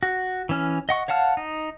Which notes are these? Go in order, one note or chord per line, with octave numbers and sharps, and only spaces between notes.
F#4
E3 C#4 F6
D#5 F#5 C#6
C#5 F5 F#5 A5 F6
D#4